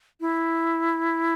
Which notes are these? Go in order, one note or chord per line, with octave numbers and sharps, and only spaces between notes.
E4